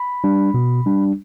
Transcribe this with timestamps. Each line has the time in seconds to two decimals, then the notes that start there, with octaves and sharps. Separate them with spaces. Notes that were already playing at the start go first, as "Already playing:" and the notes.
Already playing: B5
0.24 G3 D4
0.54 B2
0.86 G3 D4